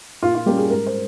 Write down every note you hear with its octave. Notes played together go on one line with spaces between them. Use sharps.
A#2 F4
F4
G3 A#3 C#4 G4
G#4
G#2 A#4
C5